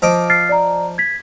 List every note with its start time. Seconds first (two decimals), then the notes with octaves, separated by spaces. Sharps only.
0.02 F3 D#5 D6
0.30 F6 A6 C7
0.49 D5 A#5
0.98 G#6 B6